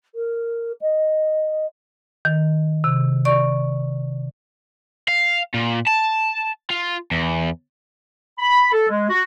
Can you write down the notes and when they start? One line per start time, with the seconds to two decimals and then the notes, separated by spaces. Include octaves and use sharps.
0.15 A#4
0.82 D#5
2.25 D#3
2.84 C3
3.25 D5 C#6
5.08 F5
5.54 A#2
5.88 A5
6.70 F4
7.11 E2
8.39 B5
8.73 A4
8.89 G#3
9.10 F#4